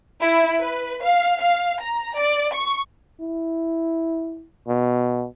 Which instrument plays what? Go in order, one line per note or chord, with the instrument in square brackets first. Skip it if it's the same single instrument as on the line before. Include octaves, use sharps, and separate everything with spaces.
[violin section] E4
B4
F5
F5
A#5
D5
C#6
[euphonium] E4
B2